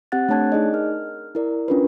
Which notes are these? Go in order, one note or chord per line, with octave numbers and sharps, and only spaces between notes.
C4 G4 F#5 F#6 A6
A3 D4 C#5 A5 F#6 G#6
D#4 G#4 D5 D#5
A#4 F6
E4 A#4 D5
C#4 D4 F4 A#4 B4